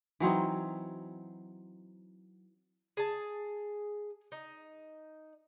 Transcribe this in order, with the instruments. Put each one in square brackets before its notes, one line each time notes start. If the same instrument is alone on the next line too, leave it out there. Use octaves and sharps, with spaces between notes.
[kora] E3 F#3 C4 D#4
[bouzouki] G#4 A5
D#4